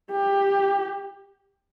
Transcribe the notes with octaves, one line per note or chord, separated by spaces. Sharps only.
G4